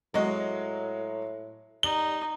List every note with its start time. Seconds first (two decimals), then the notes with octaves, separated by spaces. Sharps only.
0.14 A2 F#3 G#3 F#4 D#5
1.83 G3 D#4 G7